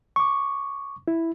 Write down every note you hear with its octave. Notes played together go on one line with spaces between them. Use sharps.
C#6 D6
E4